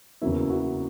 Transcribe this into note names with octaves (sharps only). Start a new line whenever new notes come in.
E2 C#3 F#3 A#3 E4
F#4